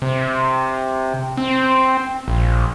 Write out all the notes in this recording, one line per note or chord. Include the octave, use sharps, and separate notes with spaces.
C3
C4
A#1